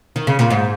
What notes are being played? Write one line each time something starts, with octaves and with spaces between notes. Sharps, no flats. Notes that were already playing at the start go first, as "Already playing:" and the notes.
D#3
C#3
A#2
G#2